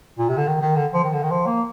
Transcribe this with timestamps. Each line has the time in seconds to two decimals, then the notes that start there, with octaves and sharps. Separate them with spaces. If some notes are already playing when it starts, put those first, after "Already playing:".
0.19 A#2
0.29 C3
0.38 D3
0.47 D#3
0.61 D#3
0.76 D3
0.94 F3
1.04 D#3
1.13 D3
1.23 D#3
1.32 F3
1.47 A#3